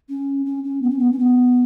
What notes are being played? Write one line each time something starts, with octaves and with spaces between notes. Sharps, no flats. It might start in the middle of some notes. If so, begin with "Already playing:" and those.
C#4
C#4
C#4
B3
C#4
B3
C#4
B3